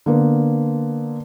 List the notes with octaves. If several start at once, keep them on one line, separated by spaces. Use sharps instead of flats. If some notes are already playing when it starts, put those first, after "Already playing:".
D3 A#3 B3